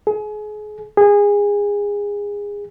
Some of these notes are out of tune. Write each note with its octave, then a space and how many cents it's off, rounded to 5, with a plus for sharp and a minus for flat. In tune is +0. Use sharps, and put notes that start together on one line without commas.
G#4 +30
G#4 -25